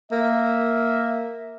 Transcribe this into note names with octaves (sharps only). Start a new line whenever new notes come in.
A#3 E5